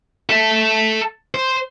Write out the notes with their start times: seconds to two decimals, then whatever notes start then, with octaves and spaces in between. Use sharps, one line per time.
0.29 A4 E5
1.34 C5